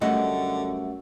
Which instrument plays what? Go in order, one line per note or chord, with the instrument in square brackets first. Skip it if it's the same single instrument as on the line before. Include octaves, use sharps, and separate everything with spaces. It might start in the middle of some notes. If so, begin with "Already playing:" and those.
[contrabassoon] F#2 [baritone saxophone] D3 [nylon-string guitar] G3 A3 F#5 [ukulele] D#5